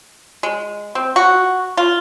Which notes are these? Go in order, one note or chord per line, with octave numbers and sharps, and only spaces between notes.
G#3
C4
F#4
F4